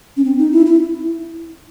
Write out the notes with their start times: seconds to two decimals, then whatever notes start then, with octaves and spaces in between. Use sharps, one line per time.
0.17 C#4
0.25 C4
0.39 D#4
0.53 E4
0.66 E4